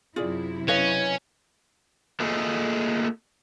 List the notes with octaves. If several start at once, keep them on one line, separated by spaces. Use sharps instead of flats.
F#2 C3 E4 F4 G#4 D5
C#4 B4 D#5 F5
A3 A#3 F4 G#4 A4 D#5